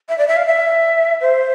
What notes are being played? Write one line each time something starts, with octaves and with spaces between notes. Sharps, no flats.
E5
D5
E5
F5
E5
C5